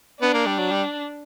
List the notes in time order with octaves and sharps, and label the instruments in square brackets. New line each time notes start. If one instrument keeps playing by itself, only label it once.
[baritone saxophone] B3 [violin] D4
[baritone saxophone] A#3
G3
F#3
G3